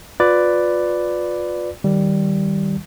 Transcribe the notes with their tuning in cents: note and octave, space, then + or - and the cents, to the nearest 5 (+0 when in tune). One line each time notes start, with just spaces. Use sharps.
F4 +30 B4 +10 D5 +0
D#3 +0 G3 -10